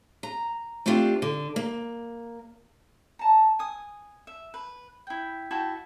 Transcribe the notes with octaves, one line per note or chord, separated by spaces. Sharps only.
A#5
A3 C4 D4 F4 G4
D3
A#3
A5 A#5
G#5 D#6
E5
B4
E4 G5
E4 F#4 G5 A5